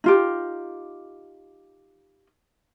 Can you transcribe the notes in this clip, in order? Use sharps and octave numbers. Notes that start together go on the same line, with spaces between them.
D#4 F4 G4